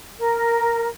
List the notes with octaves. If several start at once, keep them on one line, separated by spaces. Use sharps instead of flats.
A#4